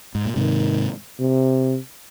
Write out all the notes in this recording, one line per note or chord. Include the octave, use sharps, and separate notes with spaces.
G#2
A#2
G#2 C3 D#3
C3